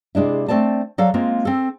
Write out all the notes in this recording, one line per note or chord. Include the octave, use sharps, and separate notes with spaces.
C3 G#3 D4 E4
A3 C4 C5 D5 A5
F#3 A4 D5 F5
G#3 A#3 C4 F4
C4 A4